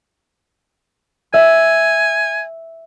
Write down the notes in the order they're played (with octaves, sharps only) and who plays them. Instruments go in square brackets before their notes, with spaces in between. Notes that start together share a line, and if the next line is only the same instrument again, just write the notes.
[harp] E5 [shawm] G#5